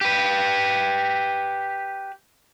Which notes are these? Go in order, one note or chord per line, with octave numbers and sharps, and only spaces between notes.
G4 B4